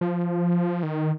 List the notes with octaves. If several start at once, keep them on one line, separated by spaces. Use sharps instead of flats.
F3
D#3